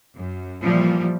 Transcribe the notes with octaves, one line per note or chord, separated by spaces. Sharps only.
F#2
A#2 E3 F3 G3